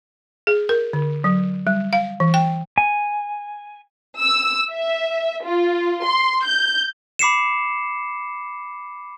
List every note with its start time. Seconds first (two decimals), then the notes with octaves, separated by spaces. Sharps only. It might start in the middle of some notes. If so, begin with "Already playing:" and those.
0.47 G#4
0.69 A#4
0.93 D3
1.24 F#3
1.67 G3
1.93 F5
2.20 E3
2.34 G5
2.78 G#5
4.19 E6
4.72 E5
5.43 F4
6.05 C6
6.45 G6
7.19 B5 D6 C7 C#7 E7